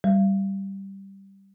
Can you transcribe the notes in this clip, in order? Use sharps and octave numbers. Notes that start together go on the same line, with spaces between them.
G3